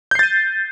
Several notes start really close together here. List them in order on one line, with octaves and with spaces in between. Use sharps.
G6 C7 A6 D#7